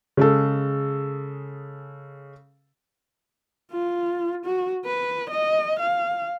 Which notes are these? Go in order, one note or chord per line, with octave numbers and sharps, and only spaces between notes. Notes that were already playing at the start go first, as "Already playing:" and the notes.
C#3 G#3 A4
F4
F#4
B4
D#5
F5